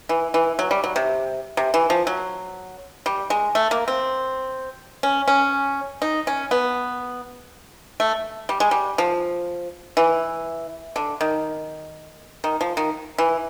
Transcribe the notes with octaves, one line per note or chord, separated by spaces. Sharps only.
E3
E3
F#3
G3
F#3
C3
C3
E3
F3
F#3
G3
G#3
A3
A#3
C4
C#4
C#4
D#4
C#4
B3
A3
G3
G#3
G3
F3
E3
D3
D#3
D#3
F3
D#3
E3